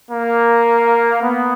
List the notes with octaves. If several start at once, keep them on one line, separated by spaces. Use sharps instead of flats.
A#3
B3